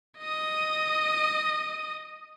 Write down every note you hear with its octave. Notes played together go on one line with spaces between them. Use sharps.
D#5 D#6